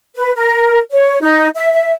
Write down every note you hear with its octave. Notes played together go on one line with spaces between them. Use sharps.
B4
A#4
C#5
D#4
E5
E5